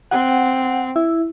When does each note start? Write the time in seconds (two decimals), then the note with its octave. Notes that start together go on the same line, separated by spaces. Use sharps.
0.11 C4 F#5
0.96 E4